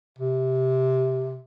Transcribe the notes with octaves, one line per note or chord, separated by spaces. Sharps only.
C3